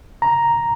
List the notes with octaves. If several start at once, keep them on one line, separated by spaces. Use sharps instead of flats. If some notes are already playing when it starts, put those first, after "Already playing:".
A#5